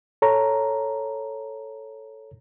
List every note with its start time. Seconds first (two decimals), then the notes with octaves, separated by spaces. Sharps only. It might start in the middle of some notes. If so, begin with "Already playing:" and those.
0.22 A4 C#5 A#5